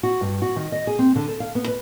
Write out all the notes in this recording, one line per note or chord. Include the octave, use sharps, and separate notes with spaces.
F#4
G2
F#4
D#3
D#5
G#4
C4
D3
A4
F5
B3
B4